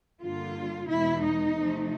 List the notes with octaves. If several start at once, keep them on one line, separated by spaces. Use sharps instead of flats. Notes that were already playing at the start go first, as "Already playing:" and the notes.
G2 D3 G3 A#3 F4
E2 B2 G#3 E4
D#4
C3 F3 A3